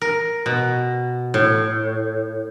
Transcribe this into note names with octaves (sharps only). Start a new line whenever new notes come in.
A#4
B2
A2